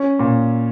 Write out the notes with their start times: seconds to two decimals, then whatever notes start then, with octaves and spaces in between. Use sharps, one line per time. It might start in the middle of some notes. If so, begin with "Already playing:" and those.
Already playing: C#4
0.19 A#2